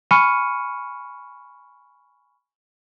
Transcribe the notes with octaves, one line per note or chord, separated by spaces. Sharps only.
G#5 B5 C#6 F6 C#7 D#7